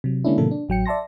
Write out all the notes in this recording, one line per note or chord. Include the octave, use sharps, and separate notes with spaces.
C3 F#3
D3 G#3 A#3 C#4 D4 E4
A2 C3 D#3 F#3 A#3 A4
D4
A1 F#3 G5 C#7
D5 E5 A5 C6 A#6